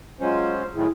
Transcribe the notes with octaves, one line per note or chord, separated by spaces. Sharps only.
F#3 G#3 C#4 F4 C5
F#2 A2 D#3 E4 G#4